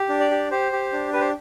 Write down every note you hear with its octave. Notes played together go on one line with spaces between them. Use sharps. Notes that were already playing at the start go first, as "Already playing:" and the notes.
Already playing: G4
D4
D5
G4
G4 C5
G4
D4
G4 B4
C5